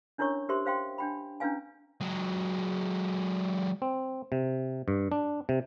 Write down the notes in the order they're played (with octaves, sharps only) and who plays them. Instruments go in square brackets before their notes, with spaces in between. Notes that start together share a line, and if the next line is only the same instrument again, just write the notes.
[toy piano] C#4 D4 E4 A#4 C#5 C#6
G4 A#4 C5 E5 C6
C5 F5 G5 C6
D4 G5 B5
C#4 D4 E4 B4 F5 G#5
[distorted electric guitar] F#3 G#3
[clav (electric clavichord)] C4
C3
G2
D4
C3